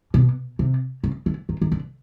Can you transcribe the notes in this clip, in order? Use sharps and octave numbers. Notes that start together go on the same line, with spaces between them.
B2
C3
C#3
D3
D#3
D#3
D3